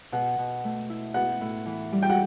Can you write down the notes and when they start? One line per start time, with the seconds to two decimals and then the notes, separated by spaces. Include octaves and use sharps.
0.12 B2 F#5
0.39 B2
0.64 A3
0.90 E4
1.14 B3 F#5
1.41 A2
1.66 E3
1.92 G3
2.02 G5
2.10 F#5